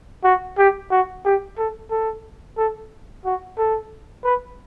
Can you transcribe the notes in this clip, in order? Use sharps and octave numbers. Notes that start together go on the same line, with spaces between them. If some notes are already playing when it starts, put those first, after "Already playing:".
F#4
G4
F#4
G4
A4
A4
A4
F#4
A4
B4